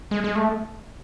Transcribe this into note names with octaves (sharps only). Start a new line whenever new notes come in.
G#3
G#3
A3